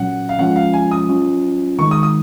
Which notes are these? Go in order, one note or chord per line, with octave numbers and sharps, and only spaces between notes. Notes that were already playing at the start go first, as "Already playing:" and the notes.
Already playing: A#2 F#3 C#4 F#5
F5
F3 G#3 C#4 F4 F#5
F5
G#5
D#6
F#3 C#4 F4
D#3 G#3 D#4 C#6
D#6
D#6